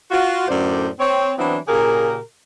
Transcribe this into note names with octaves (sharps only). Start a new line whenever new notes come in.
F4 F#4
F#2 A2 D3 C5 D5
C4 C#5
E3 F#3 B3 C4 D4 E4
A#2 C#3 G4 G#4 A#4